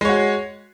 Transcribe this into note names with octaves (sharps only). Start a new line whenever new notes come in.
G#3 F#4 C#5